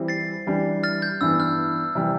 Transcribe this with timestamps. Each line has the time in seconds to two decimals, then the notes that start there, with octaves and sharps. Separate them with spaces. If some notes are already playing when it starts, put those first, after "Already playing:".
Already playing: E3 G3 C4 E4
0.08 A6 C7
0.47 E3 G3 D4
0.83 F6 A6
1.02 G6
1.21 G2 E3 B3 E6
1.40 F6
1.95 C3 E3 G3